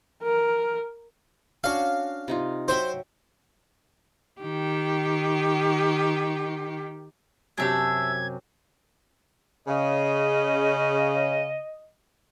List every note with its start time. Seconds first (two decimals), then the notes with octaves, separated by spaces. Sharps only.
0.23 A#4
1.64 C#4 D4 F#4 F5
2.28 C3 D#4 F4
2.68 F#3 C5 E5 G5
4.41 D#3 G4
7.58 F#2 C3 D4 G4 E5 G#6
9.67 C#3 D#5